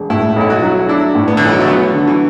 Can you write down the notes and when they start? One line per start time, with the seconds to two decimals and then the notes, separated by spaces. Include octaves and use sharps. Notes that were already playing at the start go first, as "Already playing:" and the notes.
Already playing: E1
0.10 A2 E4
0.36 B1 E4
0.50 F#4
0.62 F#3
0.89 D4 E4
1.15 A2
1.28 B3
1.37 D3
1.41 B1 E3
1.52 F#3
1.60 A3
1.68 F#3 B3
1.94 D3
2.08 E3